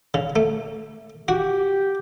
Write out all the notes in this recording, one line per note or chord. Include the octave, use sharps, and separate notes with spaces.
C#3
A3
F#4 G4